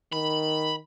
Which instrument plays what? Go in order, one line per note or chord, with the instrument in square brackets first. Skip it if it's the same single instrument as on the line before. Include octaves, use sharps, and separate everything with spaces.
[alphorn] D#3 [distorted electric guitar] B5